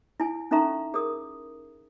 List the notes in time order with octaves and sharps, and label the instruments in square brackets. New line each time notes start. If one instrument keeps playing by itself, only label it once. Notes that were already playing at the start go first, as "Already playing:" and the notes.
[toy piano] E4 G#5
C#4 D#4 A4 E5 A#5 C#6
G#4 A#4 D#6